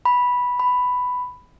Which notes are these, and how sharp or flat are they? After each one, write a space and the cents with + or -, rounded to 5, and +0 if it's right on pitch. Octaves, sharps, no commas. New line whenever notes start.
B5 -10
B5 +5